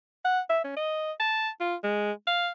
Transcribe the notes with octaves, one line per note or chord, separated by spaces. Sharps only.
F#5
E5
C#4
D#5
A5
F4
G#3
F5